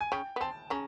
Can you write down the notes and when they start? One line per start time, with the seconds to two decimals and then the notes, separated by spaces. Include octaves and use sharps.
0.01 G#5
0.12 C#3 C#4 G5
0.36 B3
0.41 C4 A5
0.70 C#3 C#4 A#5